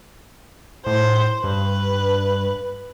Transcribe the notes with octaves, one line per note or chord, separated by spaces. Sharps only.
A2 C5
G2 B4